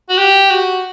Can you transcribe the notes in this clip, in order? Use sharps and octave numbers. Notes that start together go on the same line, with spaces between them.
F#4
G4
F#4